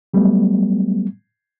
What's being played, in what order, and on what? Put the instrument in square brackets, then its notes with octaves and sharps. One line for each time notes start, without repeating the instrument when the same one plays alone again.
[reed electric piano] F#3 G3 A3 B3